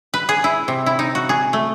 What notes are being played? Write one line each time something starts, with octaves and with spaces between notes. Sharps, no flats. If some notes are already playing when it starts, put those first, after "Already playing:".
B4
G#4
E4
C3
E4
D#4
F#4
G#4
A3